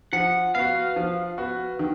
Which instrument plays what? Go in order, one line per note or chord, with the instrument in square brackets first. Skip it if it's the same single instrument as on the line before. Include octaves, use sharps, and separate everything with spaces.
[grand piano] F3 [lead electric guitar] F#5
[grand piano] B3 F#4 [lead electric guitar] F5
[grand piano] F3
B3 F#4
D#3